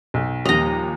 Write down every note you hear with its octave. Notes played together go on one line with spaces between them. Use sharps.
B1
D#2 A#2 F3 G3 D#5 A#5 F7